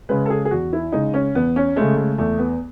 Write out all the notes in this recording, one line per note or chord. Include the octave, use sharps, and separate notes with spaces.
C#3 G#3 B4
A4
G#4
G#4
E2 F#4
E4
C#3 G#3 D#4
C#4
E2 B3
C#4
C#3 G#3 A3
A3
E2 A3
B3